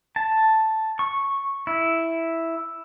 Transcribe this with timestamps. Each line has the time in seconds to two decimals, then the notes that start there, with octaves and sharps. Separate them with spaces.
0.16 A5
0.99 C#6
1.67 E4